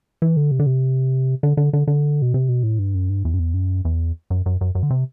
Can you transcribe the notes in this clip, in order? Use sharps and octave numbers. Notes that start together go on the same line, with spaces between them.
E3
D3
C3
D3
C3
D3
D3
D3
D3
B2
C3
B2
A2
G2
F#2
G2
E2
F#2
E2
F#2
E2
F#2
F#2
F#2
F#2
D3
C3